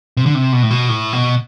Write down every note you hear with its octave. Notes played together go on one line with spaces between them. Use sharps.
C3
D3
C3
B2
A2
B2
A2
B2